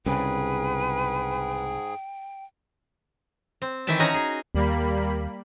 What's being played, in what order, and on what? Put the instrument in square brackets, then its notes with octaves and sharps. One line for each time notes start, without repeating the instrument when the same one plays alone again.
[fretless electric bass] C2 C#3 [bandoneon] G#2 G#4 [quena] B4 [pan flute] G5
[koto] C4
D#3 E3 E5 G5 A5
C#4 D#4 F#4 D#5 G#5 A#5
G#4 G#5
[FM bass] D#2 [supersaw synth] G3 A#3 B5